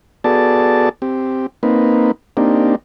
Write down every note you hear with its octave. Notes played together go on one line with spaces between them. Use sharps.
B3 F#4 G#4 A4 D5 A5
C4 G4
A#3 C4 D#4 B4
A#3 C4 D4 D#4 G4